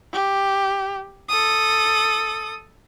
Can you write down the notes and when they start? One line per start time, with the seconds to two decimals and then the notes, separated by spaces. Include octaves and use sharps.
0.13 G4
1.29 A4 D#6